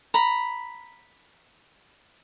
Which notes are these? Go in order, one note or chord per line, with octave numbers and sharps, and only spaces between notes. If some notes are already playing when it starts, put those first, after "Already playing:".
A#5 B5